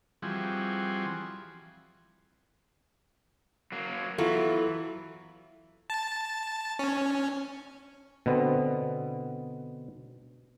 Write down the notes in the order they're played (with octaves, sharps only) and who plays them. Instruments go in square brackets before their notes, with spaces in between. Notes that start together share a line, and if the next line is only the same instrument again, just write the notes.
[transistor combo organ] E3 F3 G3 C4 F#4 G#4
[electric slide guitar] F#3 A#3
[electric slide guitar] E3 [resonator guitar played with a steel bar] F#3 B3 F4 [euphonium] E4 [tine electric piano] A4
[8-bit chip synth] A5
C#4
[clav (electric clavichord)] B2 D3 B3 C4